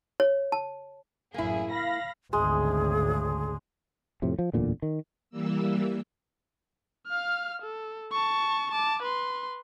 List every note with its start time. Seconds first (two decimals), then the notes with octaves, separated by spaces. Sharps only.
0.20 C#5
0.52 A5
1.34 A1 F#2 A#3 E4 G#4
1.70 F5 B5 A#6
2.33 G#1 D2 C#3 G#3 G#4
4.22 F2 A2 C3
4.39 F3
4.53 D1 E2 A#2 D3
4.82 D#3
5.30 E3 G3 A#3 E6
7.07 F5 F6
7.62 A4
8.12 A5 C#6
8.72 A5 D6
9.02 B4 C6